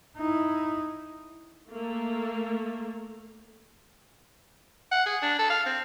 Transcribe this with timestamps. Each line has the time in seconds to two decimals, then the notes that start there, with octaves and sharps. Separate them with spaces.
0.17 D#4 E4
1.71 A3 A#3
4.92 F#5
5.06 G#4
5.22 D4
5.39 A4
5.50 F5
5.66 C4